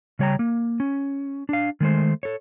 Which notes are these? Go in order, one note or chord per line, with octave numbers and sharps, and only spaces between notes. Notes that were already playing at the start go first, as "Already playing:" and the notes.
C#3 G3 C#5 G5 A#5
A#3
C#4
D4 F5
D#3 G#3 A3 C5
A4 C#5